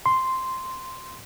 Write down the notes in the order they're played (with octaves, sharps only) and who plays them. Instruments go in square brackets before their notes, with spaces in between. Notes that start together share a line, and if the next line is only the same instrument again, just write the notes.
[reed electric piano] C6